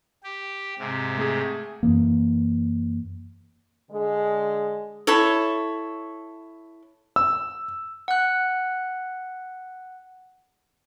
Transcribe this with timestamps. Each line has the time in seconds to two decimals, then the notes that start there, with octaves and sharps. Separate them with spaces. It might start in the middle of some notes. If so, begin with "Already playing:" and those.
0.23 G4
0.79 G#2 C3
1.18 A3 G#4
1.83 F#2 E3 A#3
3.91 D3 G#3
5.07 E4 A4 C#5
7.16 E6
8.08 F#5 F#6